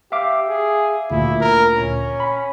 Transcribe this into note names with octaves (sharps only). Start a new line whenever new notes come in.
G4 E5 F5 D6
G#4
D2 A#2 E4
A#4
C#4
B5